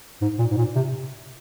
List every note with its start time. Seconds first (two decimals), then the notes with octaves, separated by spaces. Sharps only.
0.22 G#2
0.39 A#2
0.51 G#2
0.57 A#2
0.76 C3